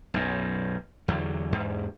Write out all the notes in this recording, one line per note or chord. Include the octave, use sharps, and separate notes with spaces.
B1 F#2
E2 D3 F#3
E2 G#2